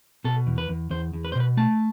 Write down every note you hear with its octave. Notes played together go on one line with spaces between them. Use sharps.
B2 A4
E2
B4
E2
E2 C5
E2
B4
C5
B2 B4
A3 A5